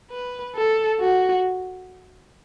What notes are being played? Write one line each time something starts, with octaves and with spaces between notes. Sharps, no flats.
B4
A4
F#4